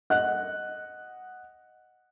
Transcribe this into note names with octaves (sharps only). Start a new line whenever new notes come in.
D#5 F#5 F#6